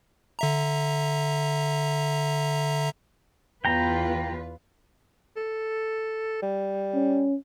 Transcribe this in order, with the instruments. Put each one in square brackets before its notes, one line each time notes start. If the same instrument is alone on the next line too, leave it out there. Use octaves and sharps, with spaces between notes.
[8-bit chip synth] D3 E5 A#5
[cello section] E2 F4 B4 [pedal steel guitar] G5 A#5
[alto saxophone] A4
G3
[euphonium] C#4